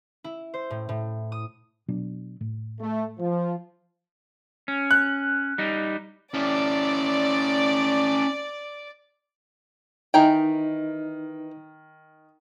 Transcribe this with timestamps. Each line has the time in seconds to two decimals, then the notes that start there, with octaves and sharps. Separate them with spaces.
0.24 E4
0.54 C5
0.70 A2
0.89 A2
1.32 D#6
1.88 B2 F#3 D4
2.41 A2
2.80 A3
3.19 F3
4.68 C#4
4.91 F#6
5.58 G3 D#4
6.34 C#4 E4 D5
10.14 D#3 E3 D#4 A#4 G5